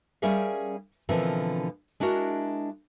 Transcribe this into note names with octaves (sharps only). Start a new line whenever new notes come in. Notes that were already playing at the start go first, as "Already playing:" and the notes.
G3 C#4 G#4 A#4 E5 F5
B2 D3 E3 F3 C4 A#4
G#3 D4 E4 F#4 A#4